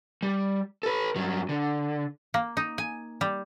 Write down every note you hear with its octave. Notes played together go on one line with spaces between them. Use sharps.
G3
A4 B4
G2 F#3
D3
A#3
D#4
G#5
G3